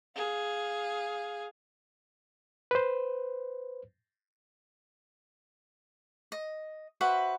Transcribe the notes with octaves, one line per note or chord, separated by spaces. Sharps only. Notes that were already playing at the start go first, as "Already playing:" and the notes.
G#4 F5
B4 C5
D#5
F#4 B4 C5 E5